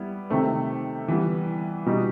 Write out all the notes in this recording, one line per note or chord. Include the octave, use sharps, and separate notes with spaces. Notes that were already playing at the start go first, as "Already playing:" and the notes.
Already playing: G3 B3 E4
C3 D#3 A3 C4
E3 G3 B3
B2 G3 D#4 F#4